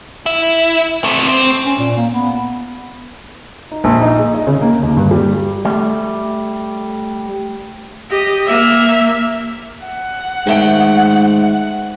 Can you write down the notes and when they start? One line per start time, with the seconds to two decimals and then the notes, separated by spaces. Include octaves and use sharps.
0.26 E4
1.04 C3 A3
1.28 C4
1.66 C#4
1.79 A#2
1.97 A#3
2.12 B3
3.71 D#4
3.84 A#1
4.01 D#4
4.19 G#4
4.35 D#5
4.47 C#3
4.61 A#3
4.83 D#2
4.97 G2
5.11 G3
5.65 G3 A3
8.10 G4 D#5
8.45 A#3 E5
9.86 F#5
10.47 G#2 D#3 A3 G5